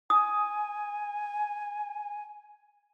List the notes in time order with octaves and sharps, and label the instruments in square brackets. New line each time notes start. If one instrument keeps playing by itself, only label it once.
[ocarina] G#5 [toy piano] D#6